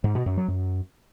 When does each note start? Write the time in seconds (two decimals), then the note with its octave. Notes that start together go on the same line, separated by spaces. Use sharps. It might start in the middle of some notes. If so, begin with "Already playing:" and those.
0.04 G#2
0.15 B2
0.26 F#2
0.37 F#3
0.48 F#2